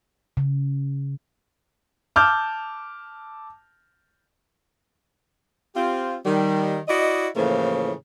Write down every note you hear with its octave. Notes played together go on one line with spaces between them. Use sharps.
C#3
A5 D6 E6 F6 G6
C4 F4 G4
D#3 G3
E4 F#4 D5 D#5
A2 C#3 E3 F3 A3 A#3